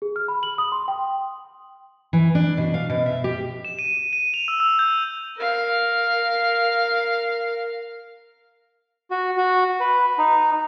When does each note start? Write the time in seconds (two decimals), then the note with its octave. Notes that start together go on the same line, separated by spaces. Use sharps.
0.02 G#4
0.16 F6
0.28 B5
0.43 F#7
0.58 D#6
0.72 C6
0.88 G5
2.13 E3
2.35 D4
2.57 B2
2.74 F5
2.90 B2
3.06 E5
3.24 G4
3.65 E7
3.79 D#7
4.13 D#7
4.34 F7
4.48 E6
4.60 E6
4.79 G6
5.36 A#4 F5
9.11 F#4
9.37 F#4
9.80 B4
10.18 D#4